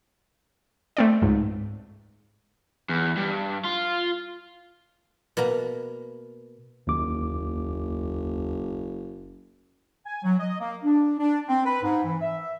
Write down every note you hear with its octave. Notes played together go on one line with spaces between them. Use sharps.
A3 C4 D5
C#2 G#2
E2
G2
F4
B2 A#3 B4 A#5
F#1 D#2 D6
G#5
F#3
D#5
A#3
D4
D4
C4
B4
G#2
E3
E5